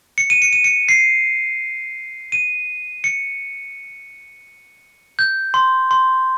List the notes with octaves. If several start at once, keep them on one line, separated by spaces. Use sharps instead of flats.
C#7
D#7
C#7
D#7
C#7
C7
D#7
C#7
G6
C6
C6